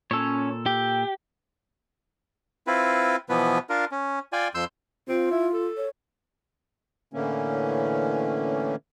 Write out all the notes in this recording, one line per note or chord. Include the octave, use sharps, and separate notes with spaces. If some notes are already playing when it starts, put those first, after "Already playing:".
A#2 C#4 A4 C#5
G4 G5
C4 E4 F4 B4
B2 E3 F3 B3 B4
D4 F4 A#4
C#4
F4 D5 G5 G#5
F2 C6 E6 G6
C4 F4
E4
A4
C#5
A2 D3 E3 A3 A#3 C#4